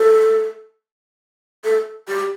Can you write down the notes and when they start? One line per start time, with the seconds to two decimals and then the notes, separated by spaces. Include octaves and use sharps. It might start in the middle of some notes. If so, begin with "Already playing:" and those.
Already playing: A4
1.65 A4
2.08 G4